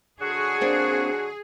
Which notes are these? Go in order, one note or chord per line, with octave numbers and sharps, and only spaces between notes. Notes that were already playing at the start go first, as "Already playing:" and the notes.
D3 F#4 G#4 C#5
A#3 C4 D4